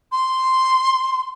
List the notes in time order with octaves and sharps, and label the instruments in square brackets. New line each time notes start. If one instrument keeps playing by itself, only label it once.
[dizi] C6